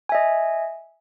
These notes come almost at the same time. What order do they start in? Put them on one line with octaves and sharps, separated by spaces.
G#5 E5 D#5